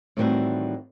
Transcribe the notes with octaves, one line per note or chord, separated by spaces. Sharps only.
A2 D#3 E3 G3 C4 F#4